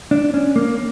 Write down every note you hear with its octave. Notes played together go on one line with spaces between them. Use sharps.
D4
C#4
A#3